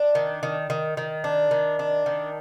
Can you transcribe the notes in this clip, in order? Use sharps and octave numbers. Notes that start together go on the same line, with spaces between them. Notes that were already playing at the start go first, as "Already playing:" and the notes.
Already playing: D4
D#3
D#3
D#3
D#3
D4
D#3
D4
D#3